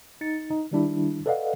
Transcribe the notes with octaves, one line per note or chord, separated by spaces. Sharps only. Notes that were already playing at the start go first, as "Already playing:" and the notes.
D#4 A6 C#7
D#4
D#3 G3 D4 E4
A4 B4 D5 D#5 F5 F#5